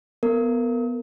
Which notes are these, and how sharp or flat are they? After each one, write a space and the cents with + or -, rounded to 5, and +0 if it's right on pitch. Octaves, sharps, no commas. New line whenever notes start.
B3 +0 A#4 -30